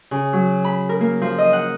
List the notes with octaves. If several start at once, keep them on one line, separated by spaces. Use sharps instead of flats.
C#3
F#3
B5
A#4
A#3
F3
D#5
F#5